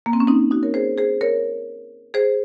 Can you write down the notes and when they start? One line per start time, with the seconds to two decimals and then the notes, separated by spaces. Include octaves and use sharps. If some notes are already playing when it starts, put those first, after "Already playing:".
0.06 A#3
0.13 C4
0.20 C#4
0.27 C4 D#4
0.51 D#4 F#4
0.63 A#4 C#5
0.74 G#4 C5
0.98 G#4 C5
1.21 A#4 C#5
2.14 G#4 C5